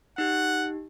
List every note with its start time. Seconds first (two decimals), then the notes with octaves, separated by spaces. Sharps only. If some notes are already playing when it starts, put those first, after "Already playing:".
0.18 D#4 G4 F#5